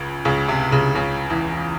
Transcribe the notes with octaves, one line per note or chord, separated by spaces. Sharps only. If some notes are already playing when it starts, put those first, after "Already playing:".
Already playing: C#2 C#3
C#2 C#3
C3
C#2 C#3
C#2 C#3
E2 E3